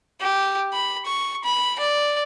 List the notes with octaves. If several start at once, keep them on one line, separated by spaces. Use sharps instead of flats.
G4
B5
C#6
B5
D5